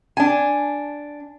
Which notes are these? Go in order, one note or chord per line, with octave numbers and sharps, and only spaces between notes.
D4 G#5